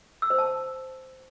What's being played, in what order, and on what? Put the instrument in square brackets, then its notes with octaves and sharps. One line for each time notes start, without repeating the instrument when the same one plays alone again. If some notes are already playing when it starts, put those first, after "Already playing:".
[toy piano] E6
C5
A5